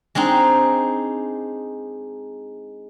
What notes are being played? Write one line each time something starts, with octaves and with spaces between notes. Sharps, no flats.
G#3 C4 D4 D#4